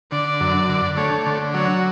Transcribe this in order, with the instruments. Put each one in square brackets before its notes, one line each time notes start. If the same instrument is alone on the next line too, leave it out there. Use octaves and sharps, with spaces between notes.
[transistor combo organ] D3 [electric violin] D5
[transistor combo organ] F#2
D3
[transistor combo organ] A3 [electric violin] C#5
[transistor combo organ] D3
[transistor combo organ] F#3 [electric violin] C#5